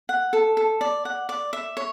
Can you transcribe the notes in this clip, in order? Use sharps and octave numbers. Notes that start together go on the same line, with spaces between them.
F#5
A4
A4
D5
F#5
D5
E5
C#5